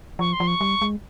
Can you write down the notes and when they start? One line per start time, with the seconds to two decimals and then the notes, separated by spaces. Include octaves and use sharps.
0.19 F3 C#6
0.33 C6
0.40 F3
0.47 C#6
0.61 G3
0.82 G#3